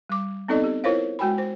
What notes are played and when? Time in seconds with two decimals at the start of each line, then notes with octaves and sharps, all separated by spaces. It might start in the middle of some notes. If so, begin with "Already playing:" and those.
0.09 G3 D6
0.48 B3 C4 D#4 A4 D5 D#5
0.64 G4
0.84 E4 F4 A#4 C5 C#5 F5
1.19 G#3 F#4 G5 G#5 B5
1.38 C5